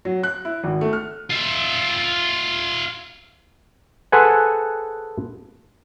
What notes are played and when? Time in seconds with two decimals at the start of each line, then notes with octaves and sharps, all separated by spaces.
0.05 F#3
0.23 F#6
0.45 E4
0.64 G#1
0.81 A3
0.93 F6
1.30 F4 E5
4.12 G#4 A4 B4 C5 F#5 G#5